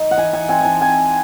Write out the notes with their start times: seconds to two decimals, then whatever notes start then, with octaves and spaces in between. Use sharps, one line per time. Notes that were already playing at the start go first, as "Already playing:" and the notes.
Already playing: D#4
0.11 F#5
0.18 E3 G#5
0.33 G#5
0.49 C4 G#5
0.61 G#5 A5
0.81 C4 G#5